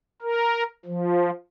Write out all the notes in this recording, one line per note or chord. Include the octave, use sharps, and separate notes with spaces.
A#4
F3